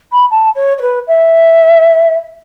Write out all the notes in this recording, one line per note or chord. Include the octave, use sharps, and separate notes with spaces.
B5
A5
C#5
C#5
B4
E5